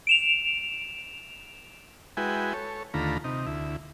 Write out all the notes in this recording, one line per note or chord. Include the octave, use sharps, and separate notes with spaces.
D7 E7 F7
G#3 E4 F#4 B4 G5 G#5
A4 C#5
D#2 D3 A3 F4 A#5 B5
C3 D#4
D2 E4